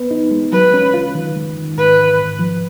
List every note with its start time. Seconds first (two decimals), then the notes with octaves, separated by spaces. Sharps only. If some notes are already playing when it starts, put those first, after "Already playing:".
Already playing: B3 B4
0.11 D#4
0.31 G#3
0.52 F#3 B4
0.74 C#4
0.94 F4
1.15 D#3
1.36 G#3
1.56 D#3
1.77 G#2 B4
1.98 G#2
2.19 G#2
2.39 F3